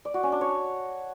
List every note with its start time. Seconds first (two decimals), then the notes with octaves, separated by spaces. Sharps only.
0.05 D5
0.14 F#4
0.23 C#4
0.32 D4
0.41 C#5